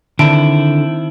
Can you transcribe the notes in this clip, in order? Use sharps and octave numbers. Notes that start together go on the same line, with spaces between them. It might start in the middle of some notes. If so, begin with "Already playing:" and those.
D3 D#3 C4 E4 A5 D7